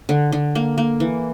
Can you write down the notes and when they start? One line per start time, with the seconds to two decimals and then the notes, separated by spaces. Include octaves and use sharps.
0.09 D3
0.32 D3
0.55 A#3
0.78 A#3
1.00 E3